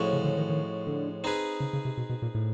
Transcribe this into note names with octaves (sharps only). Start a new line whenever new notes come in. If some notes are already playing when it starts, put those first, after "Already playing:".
Already playing: A2 F3 G#3 C#4 F#4
C#3
D3
D#3
D#3
D3
C4 D#4 G#4 B4
C#3
C#3
C3
B2
B2
A#2
A2